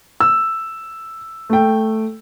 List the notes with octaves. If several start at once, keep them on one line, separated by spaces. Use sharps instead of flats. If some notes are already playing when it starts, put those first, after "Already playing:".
E6
A3 G5